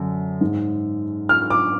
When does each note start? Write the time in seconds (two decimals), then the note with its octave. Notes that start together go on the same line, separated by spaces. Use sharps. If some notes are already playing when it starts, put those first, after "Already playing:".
Already playing: F#2 D3
0.41 G#2
1.29 F6
1.50 D6